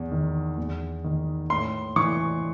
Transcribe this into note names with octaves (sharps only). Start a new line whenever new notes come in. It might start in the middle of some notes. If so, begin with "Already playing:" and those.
Already playing: E2
D#3
E2
D#3
A2 C6
E3 C#6